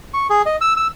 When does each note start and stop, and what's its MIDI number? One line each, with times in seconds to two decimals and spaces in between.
0.14 0.27 85
0.30 0.42 68
0.46 0.56 75
0.61 0.73 88
0.77 0.87 88